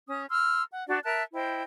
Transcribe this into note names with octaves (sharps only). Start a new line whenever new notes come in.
C#4 D#6
C6 E6 F6
F#5
D4 F#4 D5
A#4 E5 A5 F#6
E4 C5 D#5 G5